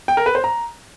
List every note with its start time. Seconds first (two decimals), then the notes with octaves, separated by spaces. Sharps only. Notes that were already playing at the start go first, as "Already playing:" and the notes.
0.08 G5
0.17 A#4
0.26 B4
0.35 C5
0.44 A#5